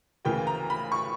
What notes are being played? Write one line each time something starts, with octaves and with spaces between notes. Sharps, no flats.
D2 C#3 E3 A#3 G5
A#5
B5
C#6